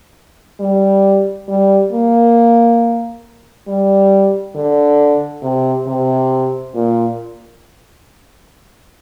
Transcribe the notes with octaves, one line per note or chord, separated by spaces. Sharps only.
G3
G3
A#3
G3
D3
C3
C3
A#2